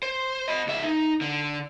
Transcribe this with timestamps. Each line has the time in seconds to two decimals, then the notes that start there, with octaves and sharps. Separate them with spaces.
0.03 C5
0.48 D#5 B5
0.67 C#2 E5
0.84 D#4
1.21 D3